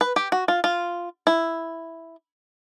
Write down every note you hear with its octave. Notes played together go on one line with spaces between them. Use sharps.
B4
G4
F#4
F4
F4
E4